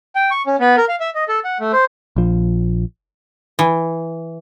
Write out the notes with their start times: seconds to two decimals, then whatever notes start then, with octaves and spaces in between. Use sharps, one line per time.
0.16 G5
0.31 C#6
0.47 C#4
0.60 B3
0.77 A#4
0.88 F5
1.00 E5
1.15 D#5
1.28 A4
1.44 F#5
1.60 A3
1.72 C5
2.16 A#1 F3
3.59 E3